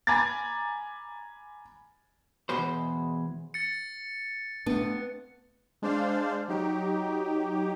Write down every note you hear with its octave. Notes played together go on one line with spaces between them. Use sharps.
G#5 A#5 B5 D6 G#6 A6
E2 B2 G#3 B4 C5
A6 C#7
A3 B3 C4 D4
G#3 D4 C5 D5 F5
F#3 D#4 G4